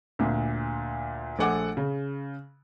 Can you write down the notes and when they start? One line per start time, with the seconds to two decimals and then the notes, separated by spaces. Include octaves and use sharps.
0.19 D2 A#2
1.39 A#1 A3 A4 F#5 G#5 D6
1.77 C#3